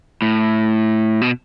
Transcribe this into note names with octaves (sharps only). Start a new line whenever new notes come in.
A2
B2